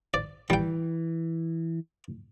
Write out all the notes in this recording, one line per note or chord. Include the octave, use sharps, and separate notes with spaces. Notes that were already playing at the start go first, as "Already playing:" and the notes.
D5
E3 G3 G5